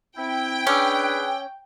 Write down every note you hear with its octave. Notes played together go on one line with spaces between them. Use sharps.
C4 E4 G5
C#4 D4 G#4 B4 G#5 D6 E6